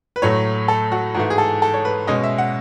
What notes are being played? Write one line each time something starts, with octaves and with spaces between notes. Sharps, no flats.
B4
A2 F#3 A3 C#5
A4
F#4
G#2 E3 A3 F#4
G#4
A4
A4
C#5
B4
B2 G#3 C#4 D#5
E5
F#5